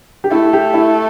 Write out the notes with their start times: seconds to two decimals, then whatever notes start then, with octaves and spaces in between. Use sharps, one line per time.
0.24 G4
0.31 A3 E4
0.53 G4
0.74 E4